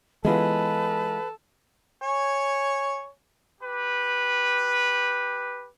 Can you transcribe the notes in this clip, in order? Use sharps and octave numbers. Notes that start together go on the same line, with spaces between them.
E3 G#3 B3 F4 A4 B4
C#5 G#5
G4 B4